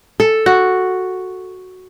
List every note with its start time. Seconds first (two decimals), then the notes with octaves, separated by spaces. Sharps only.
0.20 A4
0.46 F#4